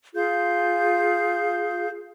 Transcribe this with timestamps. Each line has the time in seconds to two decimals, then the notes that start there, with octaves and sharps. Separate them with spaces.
0.15 F4 G#4 F5 G6